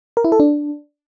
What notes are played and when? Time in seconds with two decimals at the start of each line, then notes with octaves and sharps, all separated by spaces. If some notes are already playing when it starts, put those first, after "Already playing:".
0.17 A#4
0.24 E4
0.32 A4
0.40 D4